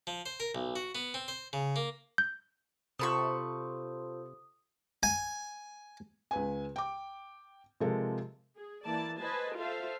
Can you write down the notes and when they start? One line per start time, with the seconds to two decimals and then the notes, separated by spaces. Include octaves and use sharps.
0.07 F3
0.26 C5
0.40 A#4
0.55 B1
0.76 F#4
0.95 B3
1.14 C4
1.28 C5
1.53 C#3
1.76 A#3
2.18 G6
2.99 C3 F4 A4 C5 A5 B5 C#6 D#6
5.03 G#5
6.31 C#2 B4 G#5
6.76 G5 D6
7.80 C3 F3 G#3 A4 A#4
8.56 G#4
8.85 E3 A#3 D5 A5
9.20 B4 C5 D#5 G#5 A5
9.55 F4 A4 C5 E5 F5